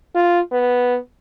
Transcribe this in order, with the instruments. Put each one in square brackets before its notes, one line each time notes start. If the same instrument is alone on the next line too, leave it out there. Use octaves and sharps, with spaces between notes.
[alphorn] F4
B3